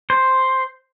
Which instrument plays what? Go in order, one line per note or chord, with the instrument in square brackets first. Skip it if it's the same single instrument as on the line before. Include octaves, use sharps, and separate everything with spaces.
[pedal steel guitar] C5